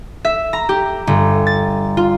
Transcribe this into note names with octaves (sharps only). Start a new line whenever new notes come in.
E5
A#5
G4
G1
A6
F4